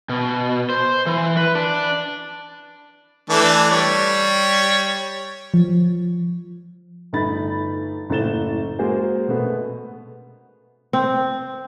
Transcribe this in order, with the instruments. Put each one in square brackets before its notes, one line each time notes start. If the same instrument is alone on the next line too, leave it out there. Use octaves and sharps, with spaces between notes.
[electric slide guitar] B2
C5
E3
B4
D4
[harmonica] E3 A3 D4
G3 C#5
[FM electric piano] F3
[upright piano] G1 A3 D#4 B5 A6
F#1 A2 A3 A6 E7 G7
G#3 A#3 F#4 G#4 C5
B2 A3 B3
[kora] C4